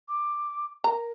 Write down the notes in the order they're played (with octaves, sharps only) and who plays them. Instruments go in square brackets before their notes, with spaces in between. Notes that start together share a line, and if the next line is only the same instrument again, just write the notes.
[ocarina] D6
[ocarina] A#4 [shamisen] A#5